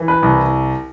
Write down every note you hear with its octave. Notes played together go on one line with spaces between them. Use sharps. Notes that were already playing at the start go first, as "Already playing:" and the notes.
Already playing: E3
B4
C2